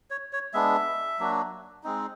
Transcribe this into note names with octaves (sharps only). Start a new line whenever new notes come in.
C#5
C#5
G#3 B3 D4 E5
F#3 A#3 D4 F#4
G#3 C4 D#4